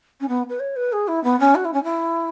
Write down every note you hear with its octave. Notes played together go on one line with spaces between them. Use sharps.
C#4
B3
B4
C#5
B4
G#4
E4
B3
C#4
F#4
E4
C#4
E4